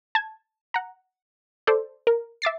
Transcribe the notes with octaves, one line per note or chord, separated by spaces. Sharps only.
A5 G#6
F#5 A#5
A4 C5 D5
A#4
E5 D6 A6 C7